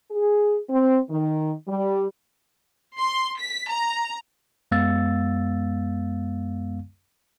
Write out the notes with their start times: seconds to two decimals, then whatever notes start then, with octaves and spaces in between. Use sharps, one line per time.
0.11 G#4
0.70 C4
1.10 D#3
1.68 G3
2.98 C6
3.38 B6
3.70 A#5
4.71 F#2 G#3 B3 F5 E6 A6